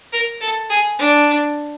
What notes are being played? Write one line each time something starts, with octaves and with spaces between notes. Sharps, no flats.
A#4
A4
G#4
D4